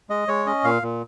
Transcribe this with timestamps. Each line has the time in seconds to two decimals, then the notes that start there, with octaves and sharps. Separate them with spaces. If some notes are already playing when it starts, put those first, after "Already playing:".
0.10 G#3 D#5
0.28 G#3 C#5
0.46 C#4 D#5
0.64 A#2 F5
0.82 A#2